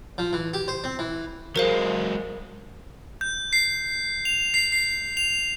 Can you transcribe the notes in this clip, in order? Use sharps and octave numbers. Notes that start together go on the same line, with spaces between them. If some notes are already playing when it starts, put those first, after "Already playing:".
F3
E3
G4
C5
C4
E3
F#3 G#3 A#4 C5 F5
G6
C7
F7
C7
C7
F7